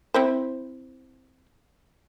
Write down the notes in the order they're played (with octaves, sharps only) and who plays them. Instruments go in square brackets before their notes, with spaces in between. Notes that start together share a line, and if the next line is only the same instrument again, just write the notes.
[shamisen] C4 E4 C5